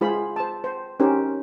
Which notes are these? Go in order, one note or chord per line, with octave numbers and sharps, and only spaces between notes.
G#3 F4 G#4 C5 B5
C5 A5
C5
C#4 D#4 G4 A#4 C5